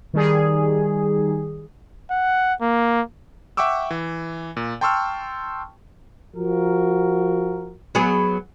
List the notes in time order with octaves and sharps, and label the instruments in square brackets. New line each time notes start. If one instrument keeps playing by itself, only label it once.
[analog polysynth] D#3 G3 G#4
[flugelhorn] F#5
A#3
[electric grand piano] E5 F#5 G5 C#6 D6 E6
E3
A#2
G5 A5 C6 C#6 E6 F6
[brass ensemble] F3 F#4 A#4
[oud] F#3 B3 G#4